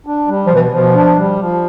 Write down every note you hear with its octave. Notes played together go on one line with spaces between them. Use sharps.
D4
G3
B2 F3
E3
B2 F3
D4
G3
F3